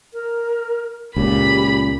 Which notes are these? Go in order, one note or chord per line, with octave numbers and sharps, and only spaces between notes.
A#4
C#2 A#2 G4 B5